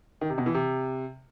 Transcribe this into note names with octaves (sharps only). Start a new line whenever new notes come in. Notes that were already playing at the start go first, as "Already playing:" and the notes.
D#3
C3
B2
E3
C3